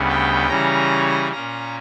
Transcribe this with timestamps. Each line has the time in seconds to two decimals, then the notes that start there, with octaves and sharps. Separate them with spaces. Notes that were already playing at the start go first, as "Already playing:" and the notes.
Already playing: D2 C#3 G3 B3
0.09 G5
0.49 C#3 E3 G3 C#4 A#5
1.32 A#2 A#3 C#4 A#5